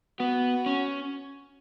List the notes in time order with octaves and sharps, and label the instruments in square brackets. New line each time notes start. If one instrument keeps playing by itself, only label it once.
[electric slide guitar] B3 [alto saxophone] F#4
[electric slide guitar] C#4